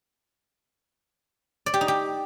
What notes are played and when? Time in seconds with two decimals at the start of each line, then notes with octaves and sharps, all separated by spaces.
1.66 D5
1.74 G4
1.81 D#4
1.88 G4